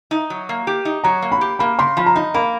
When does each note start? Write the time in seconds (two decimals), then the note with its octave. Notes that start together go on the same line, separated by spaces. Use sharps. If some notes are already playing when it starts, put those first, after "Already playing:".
0.11 D#4
0.30 F#3
0.49 A#3
0.67 G4
0.85 D#4
1.04 F#3 A#5
1.22 A#3
1.32 B5
1.41 G4
1.59 A#3 B5
1.79 C#3 C6
1.97 F3 B5
2.06 A#5
2.16 D#4 B5
2.34 A#3 B5